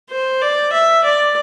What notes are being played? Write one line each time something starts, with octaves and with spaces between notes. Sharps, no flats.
C5
D5
E5
D5